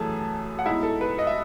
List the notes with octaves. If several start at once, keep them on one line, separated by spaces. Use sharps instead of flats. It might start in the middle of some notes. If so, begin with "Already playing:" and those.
Already playing: F#2 E3 A3 G#4 A5
F#5
B2 G#3 D#4 E4 E5
A4
B4
D#5
E5